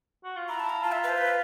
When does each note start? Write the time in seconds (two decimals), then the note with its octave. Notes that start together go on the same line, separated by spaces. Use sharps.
0.24 F#4
0.36 F4
0.48 E4 A#5
0.60 A5
0.69 A#5
0.83 F4 A5
0.92 E5
1.04 B4
1.09 C5
1.18 B4